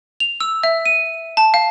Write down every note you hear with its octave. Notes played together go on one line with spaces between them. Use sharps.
F7
E6
E5
D#7
A5
F5